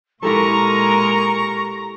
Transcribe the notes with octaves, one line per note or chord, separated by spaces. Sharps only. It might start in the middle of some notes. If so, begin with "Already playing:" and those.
A#2 G#3 E4 G4 A4 A#4 A#5 C#6